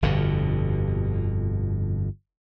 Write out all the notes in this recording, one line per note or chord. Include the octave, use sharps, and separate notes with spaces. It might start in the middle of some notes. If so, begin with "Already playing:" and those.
G1 F2 B2 D3